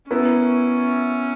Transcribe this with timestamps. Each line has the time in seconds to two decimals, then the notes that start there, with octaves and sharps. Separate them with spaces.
0.10 B3 C#4 E4 A#4 E5